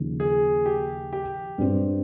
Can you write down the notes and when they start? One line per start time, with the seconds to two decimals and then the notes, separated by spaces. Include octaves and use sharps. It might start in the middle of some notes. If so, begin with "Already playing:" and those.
Already playing: D#2 C#3 F3
0.20 G#4
0.66 G4
1.13 G4
1.58 G2 G3 C4